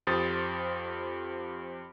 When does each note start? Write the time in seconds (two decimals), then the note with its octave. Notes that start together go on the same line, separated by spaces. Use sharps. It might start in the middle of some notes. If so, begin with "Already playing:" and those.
0.07 F2 G4 C5 D#6 A6